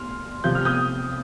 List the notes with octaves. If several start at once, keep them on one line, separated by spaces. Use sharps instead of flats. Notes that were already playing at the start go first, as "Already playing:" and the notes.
Already playing: C6 F6
C3 F3 G6
F6
D#6 G6